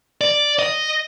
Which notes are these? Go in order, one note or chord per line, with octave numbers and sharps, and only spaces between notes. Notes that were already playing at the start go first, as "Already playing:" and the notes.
D5
D#5